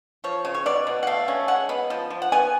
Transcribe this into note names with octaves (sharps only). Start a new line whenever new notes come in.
F3 C#5
C#3
C#5
B2 D5
B2
F#5
A3 F5
C#4
G#3 F#5
B3
F3
F3
F#5
B3 G#5